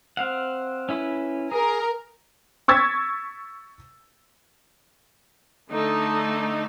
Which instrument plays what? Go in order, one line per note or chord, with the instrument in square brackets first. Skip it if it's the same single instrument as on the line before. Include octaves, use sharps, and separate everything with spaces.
[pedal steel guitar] C4 F5 F#5
C#4 E4 B4
[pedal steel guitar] G#4 [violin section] A#4
[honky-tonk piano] C#6 E6 G#6 A6 B6
[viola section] D3 A3 D#4